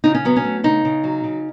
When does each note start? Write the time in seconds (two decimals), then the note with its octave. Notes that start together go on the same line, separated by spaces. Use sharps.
0.04 C#3 D#4
0.14 C#4
0.25 F#3 B3
0.36 C#4
0.44 A3
0.64 C#3 D#4
0.85 C#3
1.04 F#3
1.24 C#3